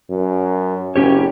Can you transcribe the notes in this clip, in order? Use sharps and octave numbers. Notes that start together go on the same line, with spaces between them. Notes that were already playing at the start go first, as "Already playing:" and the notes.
F#2
F#1 C#4 G4 C#5